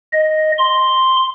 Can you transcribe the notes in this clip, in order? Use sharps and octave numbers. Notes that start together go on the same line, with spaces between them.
D#5
C6